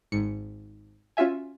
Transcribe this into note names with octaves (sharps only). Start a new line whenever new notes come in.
G#1 G#2 C#7
C#4 F4 F#4 E5 G#5